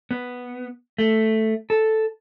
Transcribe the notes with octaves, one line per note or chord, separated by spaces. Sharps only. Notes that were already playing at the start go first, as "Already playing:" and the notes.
B3
A3
A4